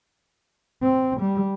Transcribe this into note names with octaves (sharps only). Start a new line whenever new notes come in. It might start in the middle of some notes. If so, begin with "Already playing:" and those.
C4
G3